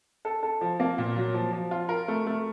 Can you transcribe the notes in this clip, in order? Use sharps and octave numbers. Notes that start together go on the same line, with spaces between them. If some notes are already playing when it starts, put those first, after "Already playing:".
A4
A4
F3
A#3
A#2
F#3
F3
F3
F4
A#4
A3
A3